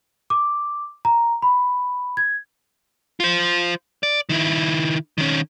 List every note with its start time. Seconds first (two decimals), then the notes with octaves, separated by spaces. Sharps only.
0.30 D6
1.05 A#5
1.42 B5
2.17 G#6
3.20 F4 C5
4.03 D5
4.29 D#3 E4
5.18 D#3 C#4